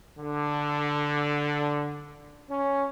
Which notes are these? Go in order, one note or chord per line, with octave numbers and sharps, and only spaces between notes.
D3
C#4